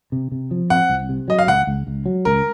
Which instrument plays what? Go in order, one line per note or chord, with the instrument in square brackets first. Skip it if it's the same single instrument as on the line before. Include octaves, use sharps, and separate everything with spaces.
[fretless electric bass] C3
C3
F3
[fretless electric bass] C4 [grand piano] F#5
[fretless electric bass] C2
C3
[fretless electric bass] F#3 [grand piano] D#5
[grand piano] F5
[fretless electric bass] C#2 [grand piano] F#5
[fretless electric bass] C#2
C#2
F#3
[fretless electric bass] C#2 [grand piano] A#4